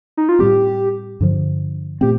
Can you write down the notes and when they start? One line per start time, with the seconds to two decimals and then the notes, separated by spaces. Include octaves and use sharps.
0.17 D#4
0.29 F4
0.39 A2 G3 C4 G4
1.21 G2 D3 F3
2.01 A#2 A3 C4 G4